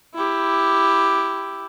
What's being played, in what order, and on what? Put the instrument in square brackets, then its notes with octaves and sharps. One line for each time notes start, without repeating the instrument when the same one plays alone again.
[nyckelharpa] E4 G4